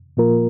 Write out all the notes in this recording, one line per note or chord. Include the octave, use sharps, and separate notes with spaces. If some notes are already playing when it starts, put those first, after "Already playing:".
A#2 F3 A#3 F4 A#4